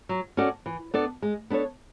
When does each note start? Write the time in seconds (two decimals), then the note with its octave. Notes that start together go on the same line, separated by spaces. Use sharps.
0.09 F#3
0.37 C#4 F#4 A4 D5
0.66 E3
0.94 B3 D4 A4 D5
1.22 G#3
1.50 B3 D4 A4 C#5